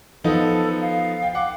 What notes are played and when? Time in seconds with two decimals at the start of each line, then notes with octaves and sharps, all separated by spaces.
0.24 F3 B3 D#4 A4
0.81 F5
1.22 G5
1.35 F#5 D6